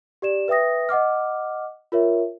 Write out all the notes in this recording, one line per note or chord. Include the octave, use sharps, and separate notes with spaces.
G4 D5 E7
B4 E5 G5 D#6 A#6
D#5 F#5 D6 F6
F4 A#4 C#5 E5